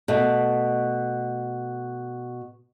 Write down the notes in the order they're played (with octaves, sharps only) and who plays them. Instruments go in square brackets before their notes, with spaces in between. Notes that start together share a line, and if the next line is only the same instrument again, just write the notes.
[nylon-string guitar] B2 A3